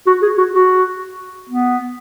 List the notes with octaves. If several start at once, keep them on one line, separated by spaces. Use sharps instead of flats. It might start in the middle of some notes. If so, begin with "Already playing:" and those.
F#4
G#4
F#4
F#4
B3